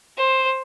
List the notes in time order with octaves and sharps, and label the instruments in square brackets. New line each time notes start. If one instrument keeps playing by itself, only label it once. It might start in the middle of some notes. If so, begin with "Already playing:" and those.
[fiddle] C5